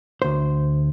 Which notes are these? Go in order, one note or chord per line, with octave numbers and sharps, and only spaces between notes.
D2 C5